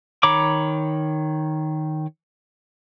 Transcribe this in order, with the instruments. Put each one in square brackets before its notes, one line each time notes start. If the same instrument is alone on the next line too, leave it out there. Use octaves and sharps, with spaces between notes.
[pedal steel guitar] D#3 C#5 A#5 B5 D6